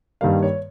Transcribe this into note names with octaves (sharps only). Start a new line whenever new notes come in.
G2 D#3 G3 A#3 F5
C#5